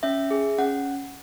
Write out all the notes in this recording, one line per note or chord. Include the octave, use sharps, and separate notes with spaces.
C#4 E5
G#4
C#4 F#5